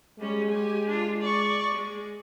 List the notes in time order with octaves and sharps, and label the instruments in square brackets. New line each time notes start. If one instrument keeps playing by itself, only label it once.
[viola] G3 C#4 [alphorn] G#3
[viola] G4 G#5
D4 F4
D5 C#6
G#3